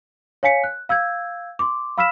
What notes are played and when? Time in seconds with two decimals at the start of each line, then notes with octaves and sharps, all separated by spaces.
0.43 C#5 F5 G#5 B6 C#7
0.64 F#6
0.89 F5 E6 G6 G#6
1.59 C6 D6
1.98 F5 B5 E6 F6 B6 E7